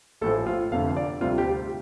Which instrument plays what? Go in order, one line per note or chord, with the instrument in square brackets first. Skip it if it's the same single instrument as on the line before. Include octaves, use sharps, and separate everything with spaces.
[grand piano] A1 A2 F3 A4
F4
F1 F2 D3 F5
D5
D2 C3 G3 F4
G4